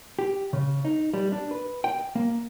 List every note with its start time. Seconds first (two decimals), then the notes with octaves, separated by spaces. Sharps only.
0.19 G4
0.53 C#3
0.85 D#4
1.13 G3
1.32 D4
1.51 B4
1.84 G5
2.15 A#3